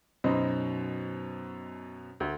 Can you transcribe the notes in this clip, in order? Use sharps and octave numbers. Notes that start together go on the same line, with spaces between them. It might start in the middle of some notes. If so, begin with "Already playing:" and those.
F#2 B2 D#4 C5 D#5 B5
D2